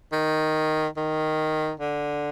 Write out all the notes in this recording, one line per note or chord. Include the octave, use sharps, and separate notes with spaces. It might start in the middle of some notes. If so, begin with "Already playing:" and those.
D#3
D#3
D3